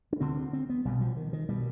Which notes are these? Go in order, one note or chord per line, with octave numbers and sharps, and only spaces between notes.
D4
D2 D3 C4
C4
B3
B1 B2 G3
F3
D#3
D#3
B2 G3